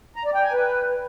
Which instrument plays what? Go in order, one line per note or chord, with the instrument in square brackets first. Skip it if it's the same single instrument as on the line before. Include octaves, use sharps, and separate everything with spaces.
[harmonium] A#5
D5
G5
G#5
B4